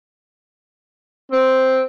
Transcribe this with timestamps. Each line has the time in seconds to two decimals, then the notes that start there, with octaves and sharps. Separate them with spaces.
1.32 C4